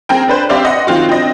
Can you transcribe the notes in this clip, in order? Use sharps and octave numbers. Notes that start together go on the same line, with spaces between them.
C4 G#4 A#4 G5
D4 B4 C5
C4 G4 C5 D5 E5 F5
D#5 F#5 C6
D#3 C4 F4 F#4
C4 D4 D#5